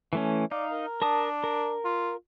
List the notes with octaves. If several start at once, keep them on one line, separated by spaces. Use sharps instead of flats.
E3 A3 C#4
D#4 D5 F5
A#4
D4 A#4 A5 D#6
A#4
F4